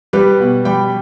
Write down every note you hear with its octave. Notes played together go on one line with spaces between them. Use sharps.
G3 G4 B4
B2
G3 G5 B5